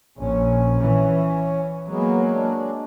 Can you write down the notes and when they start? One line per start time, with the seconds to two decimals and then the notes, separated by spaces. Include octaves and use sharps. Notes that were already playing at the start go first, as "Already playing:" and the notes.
0.18 A#1 C#4
0.81 E3
1.88 F#3 G#3 A#3 B3
2.31 G#3 D4